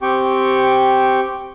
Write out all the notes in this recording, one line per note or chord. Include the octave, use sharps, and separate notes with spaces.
C4 G4 G5 C#6